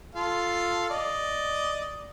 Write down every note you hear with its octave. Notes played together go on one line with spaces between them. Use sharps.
F4 A4 F5
D5 D#5